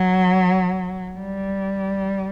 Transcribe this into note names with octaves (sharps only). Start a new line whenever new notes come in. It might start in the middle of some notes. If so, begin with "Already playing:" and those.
Already playing: F#3
G3